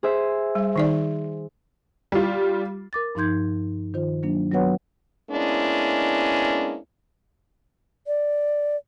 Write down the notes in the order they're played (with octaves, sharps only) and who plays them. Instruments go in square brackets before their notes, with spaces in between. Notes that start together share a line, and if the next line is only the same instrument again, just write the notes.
[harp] G#4 C5 E5
[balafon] G3
D#3 D#4 D5
[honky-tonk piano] G3 F4
[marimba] A#4 D6 A6
G2 F3 D#4 C6 G6 G#6
D#3 F4 C5
F#3 A#3 D4
F#3 B3 F#4 B4 C#5 F#5
[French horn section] G#3 A#3 B3 C#4 D4 E4
[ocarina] D5